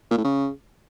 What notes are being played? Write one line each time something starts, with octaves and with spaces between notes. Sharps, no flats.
A#2
A2
C#3